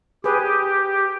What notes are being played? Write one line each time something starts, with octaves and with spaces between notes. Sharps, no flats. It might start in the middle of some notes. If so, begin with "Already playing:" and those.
G4 G#4 B4